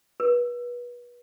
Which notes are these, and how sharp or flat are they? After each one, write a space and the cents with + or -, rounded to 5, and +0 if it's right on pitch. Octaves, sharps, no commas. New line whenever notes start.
B4 -30